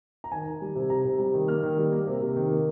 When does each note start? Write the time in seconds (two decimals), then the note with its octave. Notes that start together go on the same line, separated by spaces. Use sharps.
0.24 A#5
0.32 D#3 G#5
0.47 D#3
0.61 G3
0.75 C3
0.90 C3 A#5
1.05 C3
1.19 G3
1.34 D#3
1.48 A#3 F6
1.63 D#3
1.78 G3
1.92 A#3
2.07 C3
2.21 C3
2.36 D#3
2.50 A#3